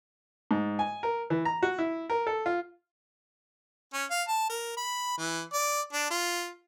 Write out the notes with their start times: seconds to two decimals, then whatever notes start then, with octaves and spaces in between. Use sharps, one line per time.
0.51 G#2
0.79 G#5
1.03 A#4
1.30 E3
1.45 A#5
1.62 F#4
1.78 E4
2.10 A#4
2.27 A4
2.46 F4
3.93 C#4
4.11 F5
4.28 A5
4.49 A#4
4.77 B5
5.17 E3
5.53 D5
5.93 D4
6.10 F4